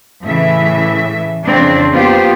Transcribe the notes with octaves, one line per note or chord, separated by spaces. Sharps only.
A2 C#3 E3 E5
F2 C#3 E3 C4 D4
A#3 B3 F4 G4 C5